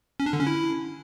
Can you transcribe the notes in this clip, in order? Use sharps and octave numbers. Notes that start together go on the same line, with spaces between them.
C#4
D4
D3
C#4
E4